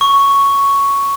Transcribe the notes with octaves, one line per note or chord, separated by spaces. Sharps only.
C#6